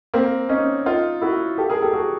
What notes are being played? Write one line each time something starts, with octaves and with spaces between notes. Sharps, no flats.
A#3 C4
C#4 D#4
D#4 F4
E4 F#4
G4 A4
G#4 A#4
G4 A4
F#4 G#4